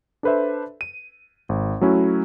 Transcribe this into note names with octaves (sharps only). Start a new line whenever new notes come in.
D4 A4 B4 C5 E5
D#7
G#1
F#3 A3 C#4 E4 F#4